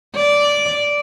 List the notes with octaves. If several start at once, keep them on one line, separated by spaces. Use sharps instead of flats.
D5